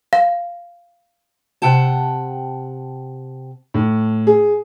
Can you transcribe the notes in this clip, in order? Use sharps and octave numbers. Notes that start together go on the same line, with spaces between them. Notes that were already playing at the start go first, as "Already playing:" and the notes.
F5
C3 F#5 G5 A5
A2
G#4